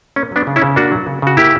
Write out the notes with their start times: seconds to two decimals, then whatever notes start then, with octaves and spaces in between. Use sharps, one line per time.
0.16 A#3 C#4
0.32 F#3 B3 D4
0.47 C#3
0.56 C#4 E4
0.62 C#3
0.76 A#3 D4 F#4
0.92 F#3
1.07 C#3
1.22 C#3 F#4
1.37 A#3 E4 G4